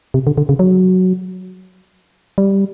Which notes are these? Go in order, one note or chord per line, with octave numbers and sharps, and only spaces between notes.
C3
D3
D3
C#3
F#3
G3